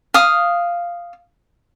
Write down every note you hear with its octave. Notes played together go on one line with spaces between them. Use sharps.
F5 D#6